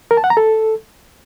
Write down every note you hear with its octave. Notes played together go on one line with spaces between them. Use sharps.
A#4
A5
F#5
A#5
A4